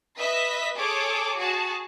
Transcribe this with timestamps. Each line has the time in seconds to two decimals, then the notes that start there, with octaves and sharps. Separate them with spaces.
0.19 B4 D#5 E5 B6
0.76 G#4 A4 C#5 D6
1.38 F#4 G#4 A5